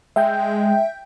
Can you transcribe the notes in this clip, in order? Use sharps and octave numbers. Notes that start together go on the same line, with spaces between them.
G#3 E5 G5 G6